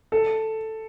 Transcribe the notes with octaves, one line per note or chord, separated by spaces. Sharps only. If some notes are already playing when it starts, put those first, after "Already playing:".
A4